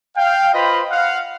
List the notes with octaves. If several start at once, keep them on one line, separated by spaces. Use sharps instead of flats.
F5 G5
F4 B4 C5 D#5 B5
F5 F#5